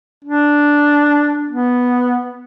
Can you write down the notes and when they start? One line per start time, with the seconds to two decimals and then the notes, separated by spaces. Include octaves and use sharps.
0.25 D4
1.50 B3